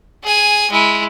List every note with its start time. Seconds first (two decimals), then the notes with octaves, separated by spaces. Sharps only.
0.24 G#4 G#5
0.71 G#3 E4